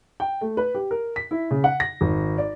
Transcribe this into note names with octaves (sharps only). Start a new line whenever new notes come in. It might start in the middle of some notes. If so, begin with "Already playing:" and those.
G5
A3
B4
G4
A#4
B6
E4
C#3
F#5
A#6
G#1
D5